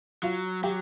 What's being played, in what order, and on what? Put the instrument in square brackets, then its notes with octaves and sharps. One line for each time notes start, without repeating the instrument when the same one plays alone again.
[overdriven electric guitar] F#3 [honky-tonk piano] F4
[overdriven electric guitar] F#3 [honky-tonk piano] G4